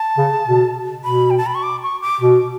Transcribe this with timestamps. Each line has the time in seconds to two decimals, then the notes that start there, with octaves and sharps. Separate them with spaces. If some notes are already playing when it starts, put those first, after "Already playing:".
Already playing: A5
0.18 C#3
0.46 B2
1.04 B2 B5
1.30 G5
1.38 A5
1.47 B5
1.55 C#6
1.63 D6
1.83 C#6
2.02 D6
2.21 B2